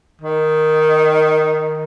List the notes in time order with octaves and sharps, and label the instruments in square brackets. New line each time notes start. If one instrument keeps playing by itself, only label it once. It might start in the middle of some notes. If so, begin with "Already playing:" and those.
[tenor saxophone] D#3